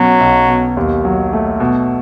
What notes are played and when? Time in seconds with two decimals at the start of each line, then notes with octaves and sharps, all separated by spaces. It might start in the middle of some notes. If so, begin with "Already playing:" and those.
Already playing: B2 F#3 C#4
0.20 B1
0.48 B2
0.77 D#2
1.05 F#3
1.33 A3
1.60 B2